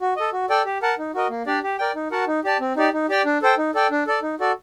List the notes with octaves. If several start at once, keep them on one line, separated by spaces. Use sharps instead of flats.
F#4
A4 D#5
F#4
A4 D5 G5
G4
A#4 F#5 A5
D#4
F#4 A#4 D#5
A#3
D4 G4 D5
G4
A#4 D5 G5
D#4
F#4 A#4 F#5 A5
D#4
G4 D5 A5
C4
D#4 G4 D5
D#4
G4 D5 G5
D4
A4 C5 G5
D#4
A4 D5 G5
D4
A4 D5
D#4
F#4 A4 D5